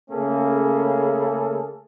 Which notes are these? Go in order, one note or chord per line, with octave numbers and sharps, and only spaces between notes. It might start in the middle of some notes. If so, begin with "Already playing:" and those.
C#3 A3 A#3 C#4 G#4 A4